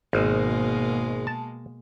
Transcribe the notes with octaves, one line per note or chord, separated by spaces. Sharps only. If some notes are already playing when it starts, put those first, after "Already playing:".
G#1 B2 G#3 A#3
A5